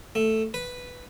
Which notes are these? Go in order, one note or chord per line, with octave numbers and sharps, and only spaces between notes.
A3
B4